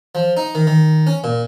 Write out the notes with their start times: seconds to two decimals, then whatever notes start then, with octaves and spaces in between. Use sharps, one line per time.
0.15 F3
0.37 D#4
0.55 D#3
0.67 D#3
1.07 C#4
1.24 A#2